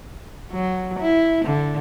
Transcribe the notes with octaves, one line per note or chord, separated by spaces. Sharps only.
F#3
E4
D3